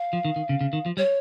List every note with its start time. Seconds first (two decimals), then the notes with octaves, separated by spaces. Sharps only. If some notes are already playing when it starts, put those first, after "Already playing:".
Already playing: F5
0.13 F3
0.25 D#3
0.36 D#3
0.49 C#3
0.61 C#3
0.73 D#3
0.86 F3
0.97 G3 C#5